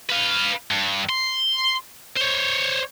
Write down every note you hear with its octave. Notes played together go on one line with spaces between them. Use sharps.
B4 F5
G2
C6
C5 C#5